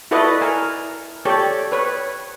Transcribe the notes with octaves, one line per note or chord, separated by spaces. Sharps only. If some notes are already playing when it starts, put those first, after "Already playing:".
E4 F#4 A4 B4 D5 D#5
A#4 G#5
G4 A4 C#5 D5
B4 C#5